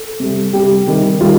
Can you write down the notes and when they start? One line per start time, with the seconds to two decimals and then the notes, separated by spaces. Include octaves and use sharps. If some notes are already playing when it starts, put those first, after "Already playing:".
Already playing: A4
0.20 C3 G3
0.53 C3 G3 G4
0.87 C3 D#3 G3
1.21 D#3 G3 F4